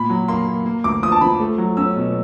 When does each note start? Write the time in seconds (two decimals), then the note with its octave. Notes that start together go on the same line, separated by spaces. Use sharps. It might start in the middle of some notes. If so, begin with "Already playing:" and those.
Already playing: A#2 B5
0.10 F#3
0.28 A#3 C6
0.47 A#3
0.66 A#3
0.84 D2 D6
1.03 F3 D#6
1.12 A5
1.21 F3 B5
1.40 A3
1.58 F#3
1.77 C#4 E6
1.96 B2